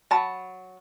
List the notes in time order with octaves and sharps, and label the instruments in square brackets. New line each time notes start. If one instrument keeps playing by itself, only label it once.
[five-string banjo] F#3 A5 B5